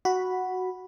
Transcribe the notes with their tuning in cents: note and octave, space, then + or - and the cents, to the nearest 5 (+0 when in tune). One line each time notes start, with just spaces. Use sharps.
F#4 +0 B5 +0